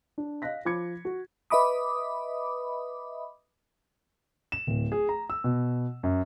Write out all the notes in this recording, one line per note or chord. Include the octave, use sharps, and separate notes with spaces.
D4
D#5 F5 F#6 A#6 B6
F3 B5 D6 G#6 C#7
F#4
B4 D#5 E5 B5 D6 D#6
E7
D1
G#4
A#5
E6
B2
F#2